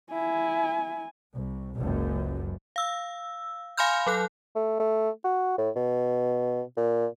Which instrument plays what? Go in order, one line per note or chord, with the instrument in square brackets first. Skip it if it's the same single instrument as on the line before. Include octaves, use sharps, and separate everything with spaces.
[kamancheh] E4 [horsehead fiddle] G#5
[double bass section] C2
F#1 C#2 F#2
[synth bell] F5 E6
F5 G#5 B5 C6 F6 G6
F#3 A4 F#6
[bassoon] A3
A3
F#4
A2
B2
A#2